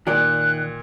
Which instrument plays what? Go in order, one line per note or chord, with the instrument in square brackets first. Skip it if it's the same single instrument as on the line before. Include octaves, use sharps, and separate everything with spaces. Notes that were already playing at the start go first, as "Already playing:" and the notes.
[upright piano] A#2 [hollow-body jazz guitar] D#3 D5 [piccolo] F#6